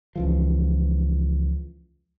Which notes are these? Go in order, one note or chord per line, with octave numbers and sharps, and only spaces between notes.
C#2 E3 F3